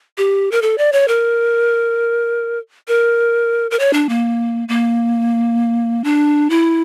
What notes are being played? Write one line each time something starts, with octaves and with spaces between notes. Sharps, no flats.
G4
A#4
A4
D5
C#5
A#4
A#4
A#4
C#5
D4
A#3
A#3
D4
E4